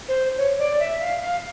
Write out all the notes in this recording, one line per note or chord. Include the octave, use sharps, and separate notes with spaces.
C5
C#5
D5
E5
F5
F5